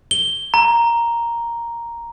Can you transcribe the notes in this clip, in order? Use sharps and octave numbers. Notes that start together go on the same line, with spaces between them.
G7
A#5